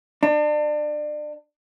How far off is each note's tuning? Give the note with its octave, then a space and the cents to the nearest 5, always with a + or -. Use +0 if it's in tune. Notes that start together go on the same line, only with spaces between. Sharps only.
D4 +30